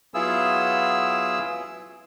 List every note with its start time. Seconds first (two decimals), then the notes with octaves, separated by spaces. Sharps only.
0.14 F#3 B3 E4 F4 G#4 E6